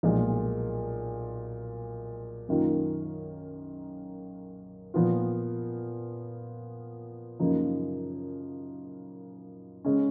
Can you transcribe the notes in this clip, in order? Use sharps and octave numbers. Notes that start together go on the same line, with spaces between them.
B1 A#2 F3 G#3
F#2 D#3 A#3 F4
A#2 F3 B3 F4
F#2 C#3 F3 A#3 D#4
C#3 G#3 C#4